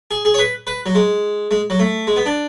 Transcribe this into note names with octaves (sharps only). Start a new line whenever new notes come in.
G#4
G#4
C#5
B4
B4
F#3
G#3
G#3
F#3
A3
G#3
B3
D4